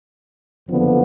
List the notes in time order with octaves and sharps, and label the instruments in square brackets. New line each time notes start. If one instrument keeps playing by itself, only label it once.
[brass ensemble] F#1 F2 D3 F3 B3